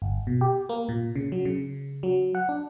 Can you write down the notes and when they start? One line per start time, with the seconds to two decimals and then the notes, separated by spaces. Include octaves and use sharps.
0.02 G1
0.27 B2
0.41 G4
0.69 A#3
0.89 A#2
1.15 C#3
1.32 F#3
1.45 C#3
2.03 F#3
2.35 F#5
2.49 D4